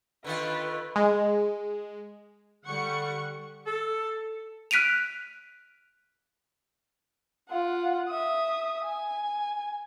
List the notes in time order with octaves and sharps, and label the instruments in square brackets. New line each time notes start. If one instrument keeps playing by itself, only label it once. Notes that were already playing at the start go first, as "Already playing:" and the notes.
[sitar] D3 D#3 F4 [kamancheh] B4
[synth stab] G#3
[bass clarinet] D3 [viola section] G3 F#5 [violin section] C#6 C#7
[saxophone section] A4
[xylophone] F6 F#6 B6 D7 D#7 F7
[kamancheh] F4 F#5
E5 D#6
G#5